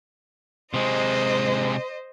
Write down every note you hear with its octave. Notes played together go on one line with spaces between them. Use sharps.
C3 G#3 C5 D#5